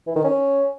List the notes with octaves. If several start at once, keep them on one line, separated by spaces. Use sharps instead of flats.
E3
D#3
C#4